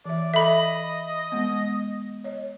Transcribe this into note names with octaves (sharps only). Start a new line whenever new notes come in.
E3 D5 E5
A4 D#5 E5 B5
G#3 B3
C#5 D#5